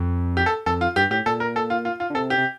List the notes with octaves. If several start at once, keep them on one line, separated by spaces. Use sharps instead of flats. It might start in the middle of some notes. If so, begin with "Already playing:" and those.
Already playing: F2
G4
A4
F2 A4
F4
G2 G4
A2 G4
A#2 A4
A#4
A4
F4
F4
F4
D3
C3 A4
G4
C3